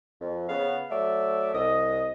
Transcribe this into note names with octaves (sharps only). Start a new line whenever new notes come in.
F2
C#3 B3 F5
F#3 A3 D5 E5
C2 D#5 D#6